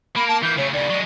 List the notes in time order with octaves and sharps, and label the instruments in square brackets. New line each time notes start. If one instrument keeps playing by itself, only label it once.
[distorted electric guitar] A#3 A#4 [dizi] B5
[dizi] A5
[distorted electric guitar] E3 A#3 [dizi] G6
[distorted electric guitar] C#3 A3 [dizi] C#5
[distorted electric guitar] D#2 C#3 [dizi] D5
[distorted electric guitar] F#3 G#3